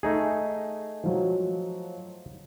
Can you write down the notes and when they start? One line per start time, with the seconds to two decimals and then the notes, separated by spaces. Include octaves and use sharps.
0.03 A3 D#4 G#4
1.04 F3 F#3